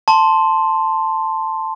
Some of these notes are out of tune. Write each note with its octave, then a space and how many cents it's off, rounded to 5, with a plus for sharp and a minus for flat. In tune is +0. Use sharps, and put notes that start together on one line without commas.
A5 +5 C6 +0